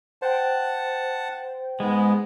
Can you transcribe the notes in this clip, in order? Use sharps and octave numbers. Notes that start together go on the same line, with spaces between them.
C5 F#5 G5 A5
G#2 G#3 B3